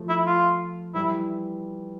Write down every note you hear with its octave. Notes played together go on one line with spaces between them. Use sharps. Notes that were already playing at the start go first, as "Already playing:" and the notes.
Already playing: F3 A3
E4
F4
E3 G3 E4